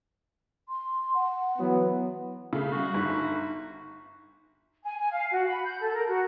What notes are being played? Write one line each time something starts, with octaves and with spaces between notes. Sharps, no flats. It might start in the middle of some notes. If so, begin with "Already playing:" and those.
C6
F#5
E3 F#3 B3
C#3 A3
G3 F#4
G1 D#4
G#5
G#5
F5
F#4
B5
G6
A4
A#4
F#4